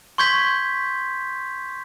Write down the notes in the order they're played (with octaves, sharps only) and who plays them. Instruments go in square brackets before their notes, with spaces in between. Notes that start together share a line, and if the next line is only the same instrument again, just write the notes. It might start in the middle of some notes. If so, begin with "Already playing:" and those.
[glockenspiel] C6 C#6 G6 G#6 B6